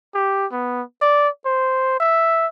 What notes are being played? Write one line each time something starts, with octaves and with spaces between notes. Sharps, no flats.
G4
B3
D5
C5
E5